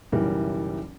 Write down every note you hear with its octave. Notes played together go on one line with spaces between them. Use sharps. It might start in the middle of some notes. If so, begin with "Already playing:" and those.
F#1 B1 E3 G3 A#4